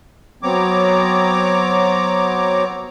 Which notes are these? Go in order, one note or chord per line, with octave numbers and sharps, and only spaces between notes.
F#3 B3 C4 C#5 A#5 D6